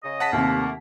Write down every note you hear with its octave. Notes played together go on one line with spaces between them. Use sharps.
C#3 D#5
F#5 A5 B6
D#2 C3 A3 A#3